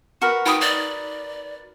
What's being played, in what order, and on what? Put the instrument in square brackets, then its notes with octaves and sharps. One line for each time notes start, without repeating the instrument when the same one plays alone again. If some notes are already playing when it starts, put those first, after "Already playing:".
[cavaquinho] F#4 A#4 B4
[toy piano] D#4 B5 D#6 [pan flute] G5
[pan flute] D5